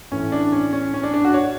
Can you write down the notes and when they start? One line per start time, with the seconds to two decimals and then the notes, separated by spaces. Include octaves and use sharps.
0.12 A2 E3 C#4
0.32 D4
0.52 C#4
0.73 C#4
0.94 C#4
1.03 D4
1.13 D4
1.24 F#4
1.34 C#5